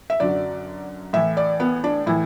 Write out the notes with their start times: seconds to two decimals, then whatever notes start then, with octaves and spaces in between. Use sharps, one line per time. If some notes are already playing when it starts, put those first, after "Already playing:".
0.10 E5
0.20 F#2 D3 F#3 D5
1.13 A2 E3 E5
1.37 D5
1.60 B3
1.84 D4
2.06 A2 E3 E4